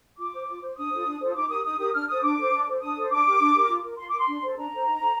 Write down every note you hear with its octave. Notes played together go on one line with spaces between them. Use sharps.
F4 D6
C5
F4
C5
D4 D#6
F4 A4 C5
D4
F4 A4 C5
D#6
D#4 D6
G4 A#4 D#6
D#4 D#6
G4 A#4 D#6
D4 F6
A4 C5 D#6
D4 D6
A4 C5
D4
A4 C5
D4 D#6
A4 C5
D4 D6
G4 A#4
D4
G4 A#4
F4
A#4
F4 C6
A#4 D6
C6
D4
A4 C5
D4 A#5
A4 C5
D#4
A4 C5